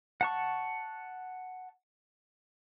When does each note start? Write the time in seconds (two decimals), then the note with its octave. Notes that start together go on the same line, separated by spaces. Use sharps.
0.21 F#5 A5 C#6